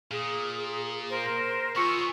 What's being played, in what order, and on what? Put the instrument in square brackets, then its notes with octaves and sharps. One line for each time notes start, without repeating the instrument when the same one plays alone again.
[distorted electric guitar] A#2 [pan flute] G#4
[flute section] A#4 C5
[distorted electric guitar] B3 G#4 [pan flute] F4 [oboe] C#6 [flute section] E6